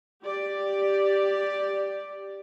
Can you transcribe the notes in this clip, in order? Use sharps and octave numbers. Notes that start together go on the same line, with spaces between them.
G4 D5